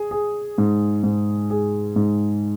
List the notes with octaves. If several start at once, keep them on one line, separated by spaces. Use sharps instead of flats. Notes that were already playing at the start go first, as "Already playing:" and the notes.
Already playing: G#4
G#4
G#2
G#2
G#4
G#2